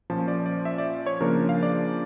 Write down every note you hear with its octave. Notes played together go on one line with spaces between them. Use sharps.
A#2 F3 C#4 A5
D5
D5
E5
D5
C#5
C#3 F3 A#3 D4 A#4
F5
D5